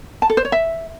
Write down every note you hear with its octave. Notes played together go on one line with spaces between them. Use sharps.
A5
A4
C5
C#5
E5